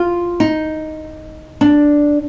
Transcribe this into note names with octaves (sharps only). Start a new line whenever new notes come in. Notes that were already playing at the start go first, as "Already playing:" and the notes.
Already playing: F4
D#4
D4